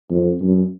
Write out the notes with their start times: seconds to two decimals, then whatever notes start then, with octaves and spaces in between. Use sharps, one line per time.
0.11 F2
0.42 F#2